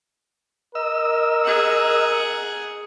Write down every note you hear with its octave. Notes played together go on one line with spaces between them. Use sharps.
A#4 D#5 E6
G#4 F#5